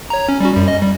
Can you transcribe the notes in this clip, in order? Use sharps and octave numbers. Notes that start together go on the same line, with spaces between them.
C#5 A#5
C#4
G3 C#4 F#4
F#2 G3
D#5
G3